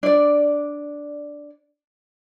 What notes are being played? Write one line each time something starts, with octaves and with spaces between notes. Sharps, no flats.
D4 D5